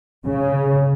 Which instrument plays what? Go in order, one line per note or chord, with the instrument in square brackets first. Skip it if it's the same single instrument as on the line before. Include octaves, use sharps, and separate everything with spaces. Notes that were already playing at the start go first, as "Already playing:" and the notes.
[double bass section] C#3